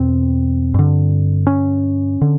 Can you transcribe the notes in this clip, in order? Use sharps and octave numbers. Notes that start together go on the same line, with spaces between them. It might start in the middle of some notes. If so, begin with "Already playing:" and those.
Already playing: E2 B2 C4
G2 D3
C#4
D3